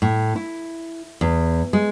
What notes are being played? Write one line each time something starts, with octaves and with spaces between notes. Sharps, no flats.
A2
E4
E2
G#3